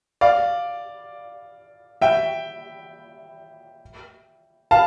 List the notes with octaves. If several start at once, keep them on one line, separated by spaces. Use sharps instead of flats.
D5 F5
E5 G5
F5 A5